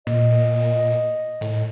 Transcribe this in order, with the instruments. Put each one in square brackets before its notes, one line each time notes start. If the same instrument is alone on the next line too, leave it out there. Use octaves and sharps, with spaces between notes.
[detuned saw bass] A#2 [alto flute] D#5
[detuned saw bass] A2